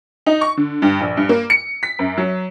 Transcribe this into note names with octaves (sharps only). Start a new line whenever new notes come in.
D#4
C#6
D3
G2
A#1
G2
A#3
C#7
B6
F#2
F#3